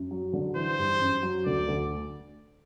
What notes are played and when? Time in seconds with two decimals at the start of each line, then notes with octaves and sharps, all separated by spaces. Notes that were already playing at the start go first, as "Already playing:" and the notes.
Already playing: F#2
0.11 F#3
0.33 D3
0.56 E3 C5
0.78 G2
1.00 F#2
1.23 F#3
1.46 D2 D5
1.68 D2